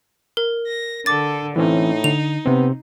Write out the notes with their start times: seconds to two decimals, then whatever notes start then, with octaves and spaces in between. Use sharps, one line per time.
0.37 A#4
0.67 A#6
1.06 D3 A4 D6 A6
1.56 A2 E3 C4 C#4 D#4
2.04 D3 F7
2.46 C3 B3 C4